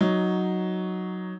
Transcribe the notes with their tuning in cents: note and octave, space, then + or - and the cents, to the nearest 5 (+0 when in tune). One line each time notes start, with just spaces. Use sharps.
F#3 +0 D#4 +0